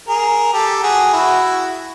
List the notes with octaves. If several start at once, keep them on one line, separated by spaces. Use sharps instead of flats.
G#4 A#4
G4 A4
F#4 G#4
E4 F#4